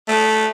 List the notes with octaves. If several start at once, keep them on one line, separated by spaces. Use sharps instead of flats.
A3